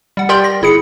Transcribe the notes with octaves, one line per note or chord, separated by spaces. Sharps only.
G3 F#5
G4 A#4 D5 G5 C6 G6
A#6
G1 E4 G#4 C#7